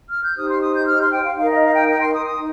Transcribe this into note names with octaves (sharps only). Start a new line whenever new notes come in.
F6
G6
D#4 G4 C5 D#6
C6
D#6
G6
F6
C6
G5
F5
D#4 A#4 F5
D#5
F5
G5
G5
C6
D#6
D#6
D#4